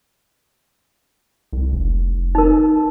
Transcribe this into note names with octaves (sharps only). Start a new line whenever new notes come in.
C2
F1
D#4 A#4